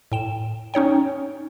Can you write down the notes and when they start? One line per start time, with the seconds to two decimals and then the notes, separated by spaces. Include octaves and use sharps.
0.12 A2 G5 E7
0.74 C#4 D#4 C#5 G5